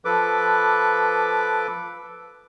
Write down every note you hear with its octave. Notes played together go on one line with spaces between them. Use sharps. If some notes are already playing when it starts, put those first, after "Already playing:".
F3 A4 B4 D6